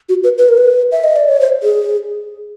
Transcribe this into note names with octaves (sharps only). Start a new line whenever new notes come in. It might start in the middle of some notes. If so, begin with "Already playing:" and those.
F#4
B4
B4
A#4
B4
E5
D#5
D5
C#5
C5
G#4